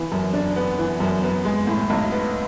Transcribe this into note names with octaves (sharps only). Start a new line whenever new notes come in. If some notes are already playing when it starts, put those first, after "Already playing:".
Already playing: E3 B3
F#2
D4
B3
E3
F#2
B3
G#3
A2
B1
B3